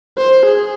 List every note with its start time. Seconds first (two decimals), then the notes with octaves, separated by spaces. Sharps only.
0.17 C5
0.45 G#4